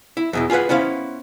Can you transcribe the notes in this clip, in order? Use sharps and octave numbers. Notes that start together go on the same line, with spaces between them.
E4
E2 B2 E3
F4 G#4 A4 B4 F#5
B3 C#4 E4 C5 F5